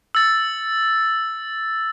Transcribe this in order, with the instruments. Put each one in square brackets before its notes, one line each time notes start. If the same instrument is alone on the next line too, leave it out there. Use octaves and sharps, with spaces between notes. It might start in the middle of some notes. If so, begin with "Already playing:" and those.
[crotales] E6 A6